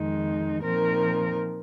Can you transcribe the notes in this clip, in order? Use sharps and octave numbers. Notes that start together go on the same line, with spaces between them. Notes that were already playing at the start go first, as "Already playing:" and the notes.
Already playing: F2 D#3 G#3 D#4
A#2 F3 C4 D#4 A#4